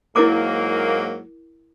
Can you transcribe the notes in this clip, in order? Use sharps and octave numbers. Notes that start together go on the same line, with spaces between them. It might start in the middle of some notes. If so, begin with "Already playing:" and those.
G#2 F#3 A#3 E4 A#4 D6